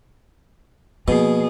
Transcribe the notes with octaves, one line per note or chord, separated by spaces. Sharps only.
B2 F3 A#3 G#4